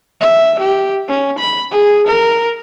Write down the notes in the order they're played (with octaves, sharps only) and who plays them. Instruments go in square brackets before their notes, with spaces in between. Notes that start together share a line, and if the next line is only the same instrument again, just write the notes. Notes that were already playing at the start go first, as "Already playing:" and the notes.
[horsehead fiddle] E5
G4
C#4
B5
G#4
A#4